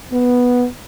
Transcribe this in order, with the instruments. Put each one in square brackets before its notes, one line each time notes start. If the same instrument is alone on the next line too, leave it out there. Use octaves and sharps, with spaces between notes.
[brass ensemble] B3